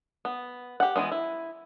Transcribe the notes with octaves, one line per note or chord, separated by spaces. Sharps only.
B3
G4 F#5
E3 F#3 G#3 B3
E4